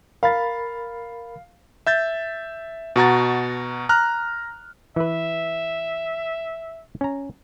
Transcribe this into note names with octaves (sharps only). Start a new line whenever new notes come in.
A#4 F5 B5 A6
E5 G6 A6
B2 F#4 A#5 A6
A#5 F6 F#6
E3 B4 E5
C#4 A#5